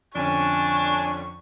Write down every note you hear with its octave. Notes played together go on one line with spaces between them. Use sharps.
F2 D3 C#4 D4 G#5 A5 C#6